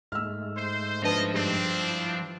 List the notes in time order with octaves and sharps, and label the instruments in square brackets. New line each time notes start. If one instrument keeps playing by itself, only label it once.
[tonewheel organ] G#2 G#3 A3 [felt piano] E6 F6
[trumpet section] C5
[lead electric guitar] F3 C5 [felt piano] D4 B4 A5 [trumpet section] D#5
[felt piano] G2 [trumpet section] C4 D4
[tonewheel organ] E4